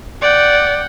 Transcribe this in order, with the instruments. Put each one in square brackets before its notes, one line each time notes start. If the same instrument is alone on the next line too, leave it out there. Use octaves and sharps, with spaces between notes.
[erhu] D5 [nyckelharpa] F#5 G5